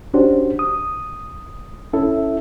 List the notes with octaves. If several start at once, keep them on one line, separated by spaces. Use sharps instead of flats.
C#4 D4 F#4 G4 C5
D#6
C#4 E4 A4 E5